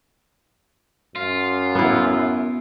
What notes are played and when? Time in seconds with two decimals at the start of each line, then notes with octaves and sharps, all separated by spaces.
1.16 F#2 F4
1.75 B3 E4